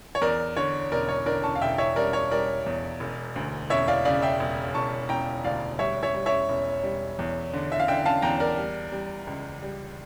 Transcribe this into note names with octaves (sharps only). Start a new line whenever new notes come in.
C#5
E2 A#4 D5
D3 C#5
E1 A#4 D5
C#5
D3 A#4 D5
A5 C#6
F5
E1 E5 G5
C#5 E5
G3 A#4 D5
C#5
G3 A#4 D5
E2
E1
D2
E1 C#5 E5
D5 F5
C#3 D5 F5
E5 G5
E1
E1 A5 C#6
E1 G5 A#5
D2 D5 F5
G3 C#5 E5
C#5 E5
G3
C#5 E5
E1
G3
E2
D3
E5
F5
D3 E5 G5
F5 A5
E2 G5 A#5
A#4 D5
G3
G3
C#2
G3